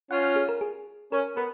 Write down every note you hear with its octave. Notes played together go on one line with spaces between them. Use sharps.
C#4 F4 F#5
F#5
G#4
A#4
G#4
C#4 A#4
B3 A#4